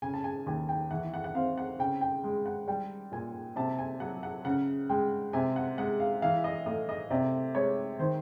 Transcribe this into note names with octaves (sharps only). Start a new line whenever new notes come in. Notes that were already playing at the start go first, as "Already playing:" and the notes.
C#3 G#5
A5
G#5
D#2 G#5
G5
E3 F#5
F#5
F#5
C4 F5
F#5
C#3 G5
G5
G#3
F#5
G3 G5
A#2 G#5
C3 A5
G#5
F#3 F#5
F#5
C#3 F#5
G#3 G5
C3 G#5
F#5
G#3 F#5
F5
E3 F5
D#5
A2 D#5
D#5
C3 D5
G#3 C#5
D#3 C5